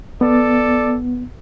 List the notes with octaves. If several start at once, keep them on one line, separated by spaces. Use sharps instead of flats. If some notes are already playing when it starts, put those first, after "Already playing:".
B3 A4 D5